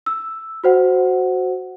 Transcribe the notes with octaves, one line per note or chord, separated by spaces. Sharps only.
E6
F#4 C5 F#5